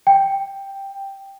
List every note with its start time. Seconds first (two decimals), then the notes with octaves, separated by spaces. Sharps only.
0.07 G5